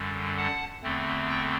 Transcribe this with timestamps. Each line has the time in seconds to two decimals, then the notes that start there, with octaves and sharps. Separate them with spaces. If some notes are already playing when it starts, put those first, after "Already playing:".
Already playing: F#2 D3 G3
0.38 F#5 A5
0.83 E2 D3 A3 C4
1.28 E5 G5